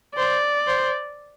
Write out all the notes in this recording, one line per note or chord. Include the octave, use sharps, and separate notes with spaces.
C5 D5
C5